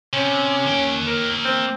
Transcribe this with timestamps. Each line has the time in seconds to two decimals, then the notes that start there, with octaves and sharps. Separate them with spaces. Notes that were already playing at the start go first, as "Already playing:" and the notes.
0.13 C3 C#4
0.67 A#3 G5
1.07 A#4
1.45 C4